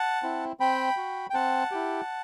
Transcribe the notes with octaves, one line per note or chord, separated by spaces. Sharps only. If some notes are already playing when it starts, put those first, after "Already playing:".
Already playing: F#5 A5
C4 E4
C4 G5 B5
F#4
G5
C4 F#5 A5
E4 G4